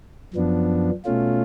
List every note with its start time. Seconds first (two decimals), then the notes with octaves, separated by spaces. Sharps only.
0.34 F#2 F3 B3 D4
1.05 B2 A3 C#4 F4